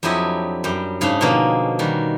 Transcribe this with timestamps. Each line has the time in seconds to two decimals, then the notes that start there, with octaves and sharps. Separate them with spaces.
0.03 F2 F#3 D4 E4 G4 D#5
0.64 F#2 G3 G5
1.01 G#2 C#3 G#3 C#4 D4
1.21 B2 D3 F3 G#3 A#3 C#4
1.79 D#3 G3 F#4